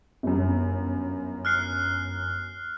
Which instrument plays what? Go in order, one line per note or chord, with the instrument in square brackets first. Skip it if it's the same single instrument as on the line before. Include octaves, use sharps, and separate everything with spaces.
[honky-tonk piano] G1 F#2
[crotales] F6 F#6 C7